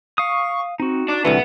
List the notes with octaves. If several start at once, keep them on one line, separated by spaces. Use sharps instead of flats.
F5 C#6 D#6
C4 D#4 F#4
D4 D6
C2 D3 E3 B3 E4 F#4 E5